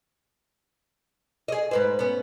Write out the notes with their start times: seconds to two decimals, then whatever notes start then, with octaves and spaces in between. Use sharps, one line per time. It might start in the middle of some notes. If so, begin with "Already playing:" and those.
1.48 G#4 D#5
1.71 G#2 B4 C5
1.99 B3 C#4